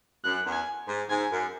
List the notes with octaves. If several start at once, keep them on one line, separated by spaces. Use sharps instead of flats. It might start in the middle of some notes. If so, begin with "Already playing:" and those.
F#2 F#6
E2
G#5
G#2
G#2 G#5
F#2